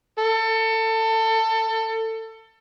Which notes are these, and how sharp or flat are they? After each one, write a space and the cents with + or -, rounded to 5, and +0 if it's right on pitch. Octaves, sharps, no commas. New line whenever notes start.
A4 +25